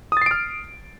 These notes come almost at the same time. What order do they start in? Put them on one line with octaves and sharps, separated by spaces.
D#6 A6 C7 D7 F6